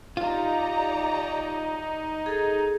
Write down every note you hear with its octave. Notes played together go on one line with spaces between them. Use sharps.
D#4 F4 G4 D5 A#5
G#4 A4